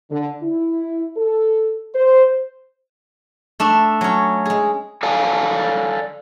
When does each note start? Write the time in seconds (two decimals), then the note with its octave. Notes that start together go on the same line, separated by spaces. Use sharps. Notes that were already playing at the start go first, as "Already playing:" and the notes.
0.11 D3
0.43 E4
1.17 A4
1.95 C5
3.60 A3 D4 E5
4.01 F#3 C#4
4.45 G#3 G#4
5.03 A4 D5 F5 G#5 A5